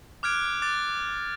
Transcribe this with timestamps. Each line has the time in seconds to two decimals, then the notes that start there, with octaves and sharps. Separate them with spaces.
0.23 D6 F6 F#6 G#6 D7
0.62 D6 F#6 A6